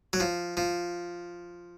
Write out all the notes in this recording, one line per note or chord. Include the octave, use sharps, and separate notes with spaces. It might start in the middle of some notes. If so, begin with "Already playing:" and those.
F#3
F3
F3